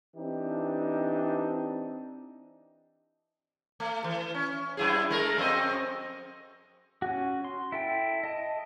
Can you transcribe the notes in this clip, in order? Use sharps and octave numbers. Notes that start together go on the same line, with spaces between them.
E3 C4 D4 D#4 G4
A3
E3
C#4
F#2 E4 G#4
G#3 A3 A#4
F2 C4 D#5
C#4 F#4
C6
E4 A4 G5
D#5 A5